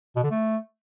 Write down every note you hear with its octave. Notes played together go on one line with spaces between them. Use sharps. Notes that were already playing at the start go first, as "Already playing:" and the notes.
B2
D3
A3